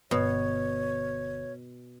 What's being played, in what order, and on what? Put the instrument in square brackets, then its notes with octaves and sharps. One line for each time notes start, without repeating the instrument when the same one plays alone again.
[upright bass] G1 [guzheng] B2 [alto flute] C#5